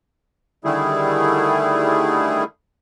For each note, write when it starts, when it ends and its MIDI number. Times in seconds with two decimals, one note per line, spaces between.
0.65 2.44 50
0.65 2.44 51
0.65 2.44 55
0.65 2.44 57
0.65 2.44 64
0.65 2.44 68